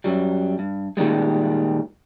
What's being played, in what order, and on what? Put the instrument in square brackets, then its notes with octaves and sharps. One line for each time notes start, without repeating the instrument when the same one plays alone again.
[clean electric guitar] F#2 F#3 G3
G2
A#2 D#3 E3 G3 G#3